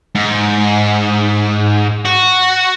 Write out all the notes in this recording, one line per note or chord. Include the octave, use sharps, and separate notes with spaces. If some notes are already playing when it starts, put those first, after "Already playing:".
G#2
F#4